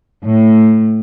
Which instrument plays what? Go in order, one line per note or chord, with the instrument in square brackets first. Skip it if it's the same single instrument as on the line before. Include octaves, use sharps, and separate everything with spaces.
[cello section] A2